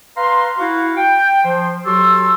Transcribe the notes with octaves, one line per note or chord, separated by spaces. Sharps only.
B4 F5 A#5 C6
E4 F#4 F5
G5
F3 C5
F#3 F#4 G4 A4 C6 E6